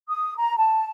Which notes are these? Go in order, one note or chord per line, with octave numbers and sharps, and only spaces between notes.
D#6
A#5
A5